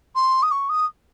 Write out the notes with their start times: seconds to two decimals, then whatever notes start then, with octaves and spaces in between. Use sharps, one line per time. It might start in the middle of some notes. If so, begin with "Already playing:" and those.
0.15 C6
0.43 D#6
0.51 C#6
0.69 D#6